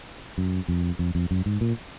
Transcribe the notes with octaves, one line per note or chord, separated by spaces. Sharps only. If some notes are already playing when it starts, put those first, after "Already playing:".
F#2
F2
F2
F2
F#2
G#2
A#2